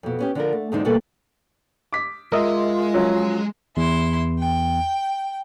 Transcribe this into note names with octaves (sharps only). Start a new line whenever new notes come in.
F2 B2
B3 C#4 G4
D3 F3 A#4
A3
E2 G#2 D3 G#3 C4 D#4
D2 B2 G3 A#3 A4 B4
D6 B6
G#3 F4 A#4 D#5 E5
F3 F#3 C#4
E2 E4 C6
G5